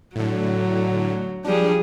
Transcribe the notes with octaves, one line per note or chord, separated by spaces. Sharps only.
A2 D3 F#3
F3 G3 D4 G#4